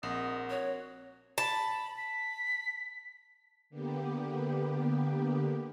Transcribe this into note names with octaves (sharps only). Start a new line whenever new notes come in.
A#1 C4 A#4 D#5 F#5
F#4 C#5
A5 B5
B6
D3 A#3 B3 G4